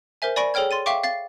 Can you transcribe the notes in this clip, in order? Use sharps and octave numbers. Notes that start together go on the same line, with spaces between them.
A#4 C5 E5 G#5
D5 G#5 B5 C#6 A#6 D7
G#4 A4 C#5 G5 F6 G#6
C6 A6 D#7
E5 F5 G5 C#6 D6
F5 A6 C7